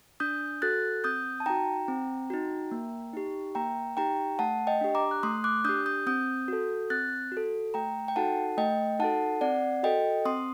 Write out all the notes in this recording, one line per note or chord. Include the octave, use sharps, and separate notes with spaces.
D4 D#6 G6
F#4 A4 F#6 A6
C4 D#6 G6
A5
D#4 F#4 G5 A#5
C4
D#4 F#4
A#3
D#4 G4
A#3 G5 A#5
D#4 G4 G5 A#5
A3 F#5 A5
D#5 G5
D4 G4
A#5 D6
F#6
A3 C6 D#6
D6 F#6
D4 G4 D#6 G6
D#6 G6
C4 D#6 G6
F#4 A4
C4 F#6 A6
F#4
A4
A3 G5 A#5
G5
D#4 F#4 A4 F#5 A5
A3 D#5 G5
D#4 F#4 A4 F#5 A5
C4 D5 F#5
F#4 A4 D#5 G5
C4 C6 D#6